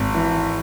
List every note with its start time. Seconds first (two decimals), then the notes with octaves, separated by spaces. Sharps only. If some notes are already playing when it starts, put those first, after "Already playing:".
Already playing: G#1
0.14 E3